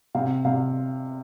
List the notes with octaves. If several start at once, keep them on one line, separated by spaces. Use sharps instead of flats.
C3 F5
C3 F5